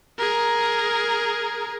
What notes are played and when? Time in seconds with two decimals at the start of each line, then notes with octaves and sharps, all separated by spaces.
0.18 G#4 A#4